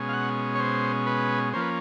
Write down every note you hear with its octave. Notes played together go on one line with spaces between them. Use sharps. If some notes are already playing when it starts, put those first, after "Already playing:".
Already playing: B2 G#3 C#4
F5
F#5
C#5
C5
B4
F3 A#3 C#4 C5
B4